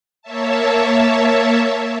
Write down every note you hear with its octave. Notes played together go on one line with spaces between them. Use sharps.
A#3 C#5 E5 A5